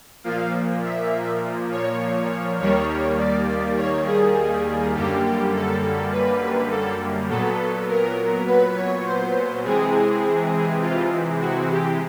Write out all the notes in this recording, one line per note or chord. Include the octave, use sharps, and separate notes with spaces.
A#2 F3 A#3 F5
E5
C#5
D#2 D#3 G3 A#3 C#5
D5
C#5
G#4
F#2 D3 G3 A#3 G4
A4
B4
A4
A#2 F#3 B3 A4
A#4
B4
C#5
C5
C3 E3 G#3 C4 G#4
F4
F#4
G4